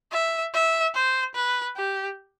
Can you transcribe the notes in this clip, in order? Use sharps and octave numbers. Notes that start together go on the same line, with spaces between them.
E5
E5
C5
B4
G4